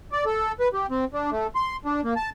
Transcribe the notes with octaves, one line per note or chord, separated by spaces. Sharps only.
D5
A4
B4
G4
C4
D4
A3
C6
D4
A#3
A5